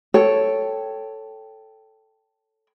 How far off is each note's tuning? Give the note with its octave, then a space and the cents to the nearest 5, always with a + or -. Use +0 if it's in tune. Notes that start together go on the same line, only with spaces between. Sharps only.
A4 +0 C#5 +0 G5 +0